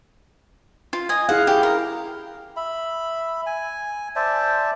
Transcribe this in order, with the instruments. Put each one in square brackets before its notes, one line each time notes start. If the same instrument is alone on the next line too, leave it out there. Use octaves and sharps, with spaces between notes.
[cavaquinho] F4
D#5 G#5
[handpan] E4 G#4 F5 [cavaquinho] F#5
[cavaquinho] G4
A#4
[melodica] E5 B5
G#5
C5 D5 E5 A5